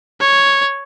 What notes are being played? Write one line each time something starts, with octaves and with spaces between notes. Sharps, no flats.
C#5